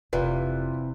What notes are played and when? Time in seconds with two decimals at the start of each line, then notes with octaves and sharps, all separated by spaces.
0.13 F1 C3 E3 F4 B4 D5